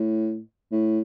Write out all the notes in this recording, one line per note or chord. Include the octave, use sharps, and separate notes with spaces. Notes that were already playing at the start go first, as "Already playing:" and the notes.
Already playing: A2
A2